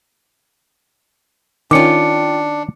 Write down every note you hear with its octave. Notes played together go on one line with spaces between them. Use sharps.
D#3 C#4 D4 F4 G5 D6 C#7